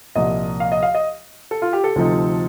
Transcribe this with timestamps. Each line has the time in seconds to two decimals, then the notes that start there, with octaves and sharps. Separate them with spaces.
0.15 C2 A#2 F3 D#5
0.60 F5
0.72 D#5
0.83 F5
0.95 D#5
1.51 A4
1.62 F4
1.73 G4
1.84 A4
1.96 D2 C3 F3 C4 D#4